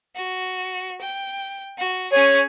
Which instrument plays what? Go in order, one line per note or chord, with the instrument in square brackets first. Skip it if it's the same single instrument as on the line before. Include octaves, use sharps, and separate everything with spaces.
[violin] F#4
G5
F#4
[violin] C#4 G#4 [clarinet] C#5